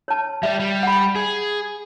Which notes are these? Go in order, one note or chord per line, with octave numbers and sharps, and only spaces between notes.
C#5 A5
G3 D5 E5
G3
F#5 B5
G#4